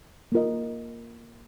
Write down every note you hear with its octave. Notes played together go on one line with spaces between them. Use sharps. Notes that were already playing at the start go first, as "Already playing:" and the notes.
A#3 F4 A#4 D#5